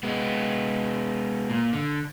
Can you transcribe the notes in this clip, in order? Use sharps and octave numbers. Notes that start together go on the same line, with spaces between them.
G#3 B3
A#2
D3